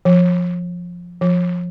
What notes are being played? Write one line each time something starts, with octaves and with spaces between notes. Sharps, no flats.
F3
F3